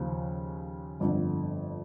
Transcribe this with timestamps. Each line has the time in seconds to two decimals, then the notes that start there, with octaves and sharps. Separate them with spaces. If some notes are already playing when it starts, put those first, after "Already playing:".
Already playing: D#2 C#3 F3
1.00 G1 F2 D3